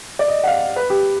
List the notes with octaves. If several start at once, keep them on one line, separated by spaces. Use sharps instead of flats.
D5
D#5
F#5
F5
B4
G4